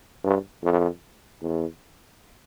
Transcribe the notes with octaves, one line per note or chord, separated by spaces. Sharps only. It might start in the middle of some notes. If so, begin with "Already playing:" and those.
G2
F2
E2